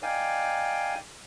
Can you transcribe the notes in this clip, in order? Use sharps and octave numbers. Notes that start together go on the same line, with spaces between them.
D#4 D5 F5 G5 G#5